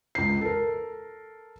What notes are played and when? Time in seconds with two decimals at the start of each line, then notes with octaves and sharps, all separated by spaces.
0.15 C#2 C7
0.41 A4 A#4